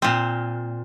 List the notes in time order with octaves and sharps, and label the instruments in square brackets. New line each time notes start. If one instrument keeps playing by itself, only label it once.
[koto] A#2 C4